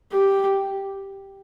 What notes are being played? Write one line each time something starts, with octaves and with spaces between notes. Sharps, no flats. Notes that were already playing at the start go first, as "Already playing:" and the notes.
G4